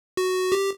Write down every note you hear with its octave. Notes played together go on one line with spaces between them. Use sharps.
F#4
G4